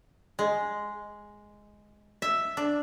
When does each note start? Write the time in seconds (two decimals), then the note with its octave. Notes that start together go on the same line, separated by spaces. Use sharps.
0.39 G#3
2.22 E5
2.57 D4